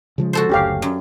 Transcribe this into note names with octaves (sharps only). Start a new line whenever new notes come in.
C#3 F3 G#3
F#4 A4 C5
F#1 D2 C#4 G4 F5
F#2